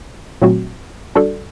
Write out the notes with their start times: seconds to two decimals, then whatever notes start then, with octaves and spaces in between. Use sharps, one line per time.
0.42 A#2 F#3 A3 C4 F#4
1.15 G3 D4 F#4 A4 D5